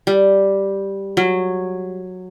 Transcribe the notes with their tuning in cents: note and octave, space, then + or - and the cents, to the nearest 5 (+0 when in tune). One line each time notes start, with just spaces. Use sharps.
G3 +0
F#3 -10